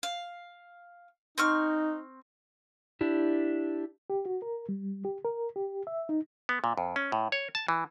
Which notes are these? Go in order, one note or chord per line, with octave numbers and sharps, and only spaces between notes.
F5
C4 D#4 C#6 F6
D4 E4 G4
G4
F#4
A#4
G3
G4
A#4
G4
E5
D#4
B3
A#2
F2
C#4
A2
C#5
A5
E3